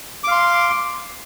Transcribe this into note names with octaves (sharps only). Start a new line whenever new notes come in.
F5 C6 D6